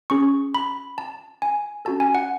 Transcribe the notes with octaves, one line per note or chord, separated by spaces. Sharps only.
C#4 G#4 C#6
B5
A5
G#5
C#4 F#4 A4 A5
G#5
F#5